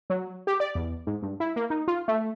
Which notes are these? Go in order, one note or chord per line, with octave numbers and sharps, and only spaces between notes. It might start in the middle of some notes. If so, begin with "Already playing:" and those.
F#3
G4
D5
E2
G#2
G2
E4
A#3
D#4
F4
A3